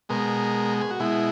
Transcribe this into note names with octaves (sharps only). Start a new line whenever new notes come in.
B2 G#3 A#4
G#4
F#4
B2 G#3 E4